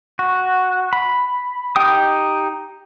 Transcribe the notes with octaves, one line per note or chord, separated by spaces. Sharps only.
F#4
B5
D#4 G4 G5 D#6